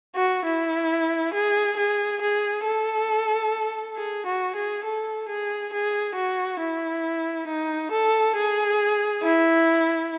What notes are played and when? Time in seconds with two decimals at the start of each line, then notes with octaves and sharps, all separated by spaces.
0.16 F#4
0.45 E4
1.33 G#4
1.77 G#4
2.21 G#4
2.65 A4
3.96 G#4
4.26 F#4
4.55 G#4
4.84 A4
5.28 G#4
5.72 G#4
6.15 F#4
6.60 E4
7.48 D#4
7.91 A4
8.36 G#4
9.23 E4